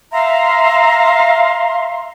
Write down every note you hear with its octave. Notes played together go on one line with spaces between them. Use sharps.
E5 F5 A#5 C6